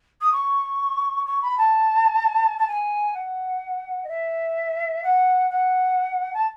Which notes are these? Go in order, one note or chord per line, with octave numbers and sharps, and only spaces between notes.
D#6
C#6
C#6
B5
A5
A5
G#5
F#5
D#5
E5
F#5
F#5
A5